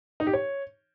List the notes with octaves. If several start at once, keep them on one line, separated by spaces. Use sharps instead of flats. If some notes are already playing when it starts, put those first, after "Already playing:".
D#4
G4
C#5